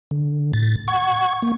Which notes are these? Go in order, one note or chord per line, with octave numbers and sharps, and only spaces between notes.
D3
A2 A6
F#5 C#6 G#6
A#3